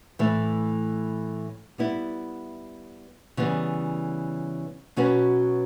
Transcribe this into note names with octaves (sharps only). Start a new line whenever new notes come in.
A2 E3 A3
G3 B3 E4
C#3 E3 G3 B3
B2 F#3 C#4 F#4 B4